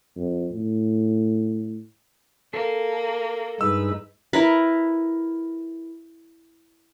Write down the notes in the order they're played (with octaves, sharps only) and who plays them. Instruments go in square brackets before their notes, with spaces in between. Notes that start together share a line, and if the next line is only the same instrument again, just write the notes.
[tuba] F2
A2
[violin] A#3 [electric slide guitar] A4
[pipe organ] G2 G#3 D#4 [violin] B4 [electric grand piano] E6
[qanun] E4 A#4 B4